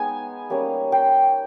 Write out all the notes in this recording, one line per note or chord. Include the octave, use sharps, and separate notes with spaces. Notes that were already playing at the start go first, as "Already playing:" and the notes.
Already playing: G#3 B3 D#4 G#5
G3 A#3 C#4
G5